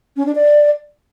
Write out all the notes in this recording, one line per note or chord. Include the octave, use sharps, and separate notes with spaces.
C#4
D4
D5